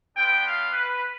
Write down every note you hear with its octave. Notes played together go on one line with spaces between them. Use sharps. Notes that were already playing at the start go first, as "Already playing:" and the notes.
B3 D4 F4 G5
F5
B4